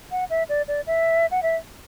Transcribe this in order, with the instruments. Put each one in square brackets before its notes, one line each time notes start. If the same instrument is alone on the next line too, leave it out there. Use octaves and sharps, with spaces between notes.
[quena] F#5
E5
D5
D5
E5
F#5
E5